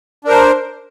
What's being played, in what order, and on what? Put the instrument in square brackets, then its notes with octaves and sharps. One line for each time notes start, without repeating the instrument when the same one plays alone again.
[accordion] D4
A#4
C5